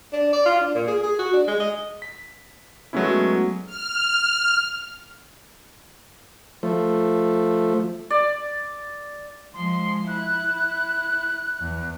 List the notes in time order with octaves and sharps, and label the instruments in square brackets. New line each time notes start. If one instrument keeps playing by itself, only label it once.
[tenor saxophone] D4
D5
F4
D4
A#2
G#4
G#4
F#4
D4
G#3
D#5
[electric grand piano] B6
F#3 G#3 A3 B3 C#4 E4
[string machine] F6
[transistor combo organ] F3 A3
[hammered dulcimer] D5
[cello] F3 G#3 [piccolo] C6
[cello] E4 [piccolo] F#6
[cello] E2